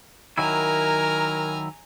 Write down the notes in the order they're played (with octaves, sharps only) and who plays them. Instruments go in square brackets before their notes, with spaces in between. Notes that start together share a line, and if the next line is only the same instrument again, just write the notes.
[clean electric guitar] D#3 F#3 E4 [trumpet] A#4 [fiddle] G#5 A#5